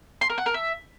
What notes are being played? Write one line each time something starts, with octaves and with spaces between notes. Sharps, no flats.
C6
A#4
F#5
A#4
E5